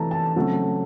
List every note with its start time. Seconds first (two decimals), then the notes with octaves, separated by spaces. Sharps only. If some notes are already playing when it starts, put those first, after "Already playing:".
Already playing: C3 E3 A3 A5 A#5
0.11 A5
0.36 C#3 F#3 A3 C4